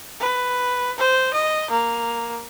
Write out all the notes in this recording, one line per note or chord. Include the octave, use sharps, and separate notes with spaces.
B4
C5
D#5
A#3